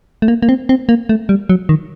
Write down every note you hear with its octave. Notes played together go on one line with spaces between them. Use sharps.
A3
A#3
A#3
C4
C4
A#3
A3
G3
F#3
D#3